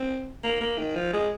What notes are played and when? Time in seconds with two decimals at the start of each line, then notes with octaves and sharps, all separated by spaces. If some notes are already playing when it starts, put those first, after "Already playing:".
Already playing: C4
0.44 A#3
0.61 A#3
0.78 D#3
0.96 F3
1.13 G#3